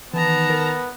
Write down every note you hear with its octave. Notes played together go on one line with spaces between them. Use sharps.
D#3 E3 B3 A5 A#5
A#4